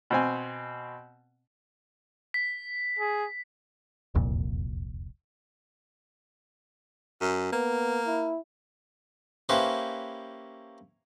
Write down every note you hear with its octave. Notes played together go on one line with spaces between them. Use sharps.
B2 C4 G#5
B6
G#4
E1 C2 F2 A#2
F#2
A#3 B3
E4
A#3 C#4 E4 G4 B4 C5